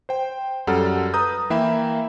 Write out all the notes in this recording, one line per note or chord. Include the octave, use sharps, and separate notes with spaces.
C5 G5
F#2 G3 A4 F#5 F6
B4 A#5 D#6 G6
E3 A#3 E5 G5 B5